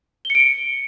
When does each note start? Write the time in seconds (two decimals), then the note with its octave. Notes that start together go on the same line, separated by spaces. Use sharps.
0.25 G7
0.30 C#7
0.35 D7
0.40 C#7